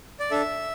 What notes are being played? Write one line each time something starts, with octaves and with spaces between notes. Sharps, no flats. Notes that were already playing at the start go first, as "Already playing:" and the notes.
D5
D4 A4 E5